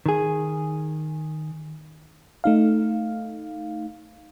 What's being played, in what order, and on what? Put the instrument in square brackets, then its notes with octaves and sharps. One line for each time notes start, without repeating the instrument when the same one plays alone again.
[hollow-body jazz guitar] D#3 G#4
[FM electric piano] A3 D#4 F5